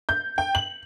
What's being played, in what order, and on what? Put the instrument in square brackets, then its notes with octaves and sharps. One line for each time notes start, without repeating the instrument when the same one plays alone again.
[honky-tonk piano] G6
G5
F#7